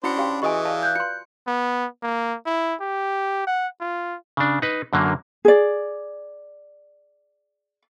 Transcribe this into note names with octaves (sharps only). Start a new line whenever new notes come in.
C#4 D4 E4 F#4 C5 F#5 B5 C#7
G4 F5 G5
E3 F#4 G#4 D#5 G#5 C#6 D#6
B4 D5 F5 A5
F#6 G6
F4 C6 C#7
B3
A#3
E4
G4
F#5
F4
C#3 D4
D#4 B4
F#2 D3 F#3 A#3
G#4 D5